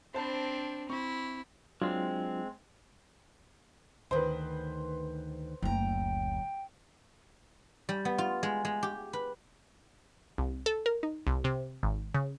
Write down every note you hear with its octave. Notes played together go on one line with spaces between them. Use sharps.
C4 D4 C5 A5 B5
C4 E4 C#6
F#3 G#3 C4 D4 F4
D2 D#3 B4 C5
F#1 D2 F#3 G5 A#5
G3
B3
F4
G#3
G#3
G4
B4
C2
A4
A#4
D#4
C2
C3
G#1
C#3